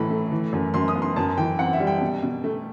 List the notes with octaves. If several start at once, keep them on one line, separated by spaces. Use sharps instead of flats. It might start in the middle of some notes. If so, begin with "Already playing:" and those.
Already playing: A2 E3 A5 B5
A3
E3
F#2
F#2 C6
D#6
B3
C6
F#2 A5
E3 G5
C4 F#5
E5
G3
G5
B2
B2
A3